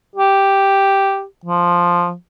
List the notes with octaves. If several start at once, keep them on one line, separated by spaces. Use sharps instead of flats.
G4
F3